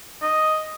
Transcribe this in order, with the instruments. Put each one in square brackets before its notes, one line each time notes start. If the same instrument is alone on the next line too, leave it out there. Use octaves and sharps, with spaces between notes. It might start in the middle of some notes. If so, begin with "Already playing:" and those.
[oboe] D#5